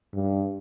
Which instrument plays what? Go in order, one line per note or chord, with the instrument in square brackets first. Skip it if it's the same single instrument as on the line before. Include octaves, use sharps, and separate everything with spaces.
[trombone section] G2